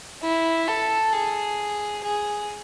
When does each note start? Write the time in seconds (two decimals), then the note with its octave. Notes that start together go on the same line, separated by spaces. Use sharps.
0.23 E4
0.68 A4
1.13 G#4
2.04 G#4